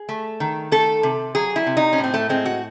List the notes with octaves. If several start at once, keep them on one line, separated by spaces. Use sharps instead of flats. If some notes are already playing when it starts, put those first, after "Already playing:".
Already playing: G#4
A3
D#3
A3 A4
C3
F#3 G#4
E4
C3
D#4
C#4
A2
C4
A3
G#3 C4
F#4